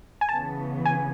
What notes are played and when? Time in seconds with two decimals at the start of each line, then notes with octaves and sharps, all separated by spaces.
0.21 G#5
0.29 C#3 E3 B3 A5
0.85 G#5